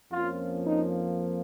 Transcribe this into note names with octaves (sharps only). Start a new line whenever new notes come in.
F2 F3 A#3 C#4 F4
D#4